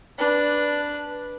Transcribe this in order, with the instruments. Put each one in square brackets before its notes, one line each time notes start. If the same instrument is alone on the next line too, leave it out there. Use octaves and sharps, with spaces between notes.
[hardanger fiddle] D4 B4